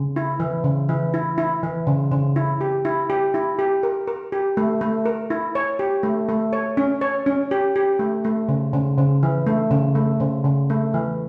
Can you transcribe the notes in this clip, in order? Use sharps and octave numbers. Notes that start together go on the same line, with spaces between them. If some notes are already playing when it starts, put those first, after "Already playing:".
Already playing: C#3
E4
E3
C#3
E3
E4
E4
E3
C#3
C#3
E4
G4
E4
G4
E4
G4
A#4
A#4
G4
A3
A3
A#4
E4
C#5
G4
A3
A3
C#5
C#4
C#5
C#4
G4
G4
A3
A3
C#3
C#3
C#3
E3
A3
C#3
A3
C#3
C#3
A3
E3